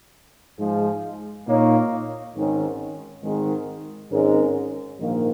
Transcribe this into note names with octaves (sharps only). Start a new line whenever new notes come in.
G#2 F3 G#3
A#2 A#3 D#4 C#5
G#1 G#2 D#3 C#4
G#1 G#2 D#3 G#3
G#1 G#2 G#3 C#4 A#4
A#1 G#2 D#3 A#3